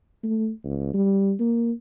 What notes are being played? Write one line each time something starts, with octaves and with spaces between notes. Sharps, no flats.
A3
C#2
G3
A#3